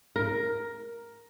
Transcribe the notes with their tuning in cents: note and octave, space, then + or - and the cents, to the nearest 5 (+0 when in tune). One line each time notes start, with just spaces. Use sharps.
A#4 +5